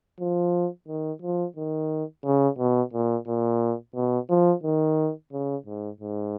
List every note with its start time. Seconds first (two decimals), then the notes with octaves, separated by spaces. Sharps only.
0.20 F3
0.88 D#3
1.22 F3
1.56 D#3
2.24 C#3
2.58 B2
2.93 A#2
3.27 A#2
3.95 B2
4.30 F3
4.63 D#3
5.33 C#3
5.66 G#2
6.01 G#2